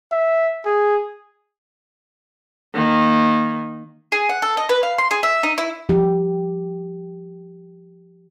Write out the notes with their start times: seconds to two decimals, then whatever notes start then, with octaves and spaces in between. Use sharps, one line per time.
0.11 E5
0.65 G#4
2.75 D#3 A#3
4.12 G#4
4.29 F#5
4.42 A4
4.57 D#5
4.69 B4
4.83 F5
4.98 C6
5.11 G#4
5.23 E5
5.43 D#4
5.58 E4
5.89 F3 G4